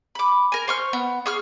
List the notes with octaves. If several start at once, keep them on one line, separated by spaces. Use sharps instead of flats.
B5 D6
A#4 G#5
C5 C#6 F6
B3
G#4 C#6 F6